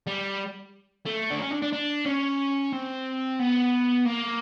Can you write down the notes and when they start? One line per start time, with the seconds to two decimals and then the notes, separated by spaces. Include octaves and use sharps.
0.07 G3
1.06 A3
1.31 D4
1.39 C#4
1.51 D4
1.62 D4
1.73 D4
2.06 C#4
2.73 C4
3.39 B3
4.06 A#3